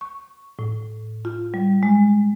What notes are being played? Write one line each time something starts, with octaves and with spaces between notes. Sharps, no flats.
C#6
A2
F4
G3
G#3